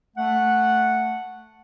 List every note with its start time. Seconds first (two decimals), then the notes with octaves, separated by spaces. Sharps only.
0.17 A3 F#5